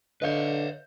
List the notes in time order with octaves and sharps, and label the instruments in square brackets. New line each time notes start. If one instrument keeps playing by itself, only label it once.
[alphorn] D3 [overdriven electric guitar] B4 C#5 [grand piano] D#5 F5 G6